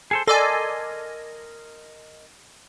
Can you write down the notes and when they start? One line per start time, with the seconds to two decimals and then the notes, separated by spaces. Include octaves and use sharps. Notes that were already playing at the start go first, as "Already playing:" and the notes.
0.11 G#4 A4 C5
0.27 A4 A#4 D5 D#5 G#5 C6